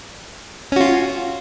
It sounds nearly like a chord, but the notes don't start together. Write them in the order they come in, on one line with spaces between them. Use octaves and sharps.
C#4 F#4 F4